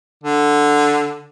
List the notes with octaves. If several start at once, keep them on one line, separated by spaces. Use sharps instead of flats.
D3